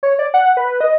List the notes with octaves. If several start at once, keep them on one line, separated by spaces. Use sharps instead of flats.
C#5
D5
F#5
B4
D#5